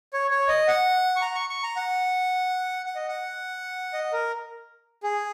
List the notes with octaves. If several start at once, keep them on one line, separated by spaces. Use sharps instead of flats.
C#5
C#5
D#5
F#5
C#6
A#5
C#6
C#6
A#5
F#5
F#5
D#5
F#5
D#5
A#4
G#4